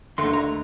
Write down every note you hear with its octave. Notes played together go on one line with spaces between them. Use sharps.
D#2 D3 A3 C6
A#5